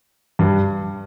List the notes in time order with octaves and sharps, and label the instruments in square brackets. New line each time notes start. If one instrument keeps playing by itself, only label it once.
[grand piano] G2